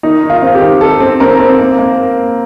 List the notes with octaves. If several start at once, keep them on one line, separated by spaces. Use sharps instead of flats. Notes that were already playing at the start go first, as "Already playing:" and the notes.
D#3 D#4
D#3
F4
C4
G4
D#3
D#3 A4
C4
C4 A#4
C4
A#3
A#3